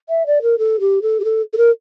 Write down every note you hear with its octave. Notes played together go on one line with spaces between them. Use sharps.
E5
D5
A#4
A4
G4
A4
G4
A4
A4
A#4